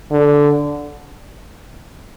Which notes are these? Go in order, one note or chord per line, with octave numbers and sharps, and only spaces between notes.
D3